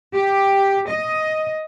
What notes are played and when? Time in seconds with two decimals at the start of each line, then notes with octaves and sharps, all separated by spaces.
0.14 G4
0.88 D#5